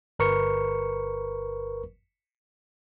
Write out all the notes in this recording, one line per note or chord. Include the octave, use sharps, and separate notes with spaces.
G1 A#4 B4 C#6 C#7